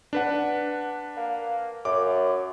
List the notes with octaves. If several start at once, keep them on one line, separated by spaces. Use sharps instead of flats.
D4 B4 F#5
A#3
F#2 D6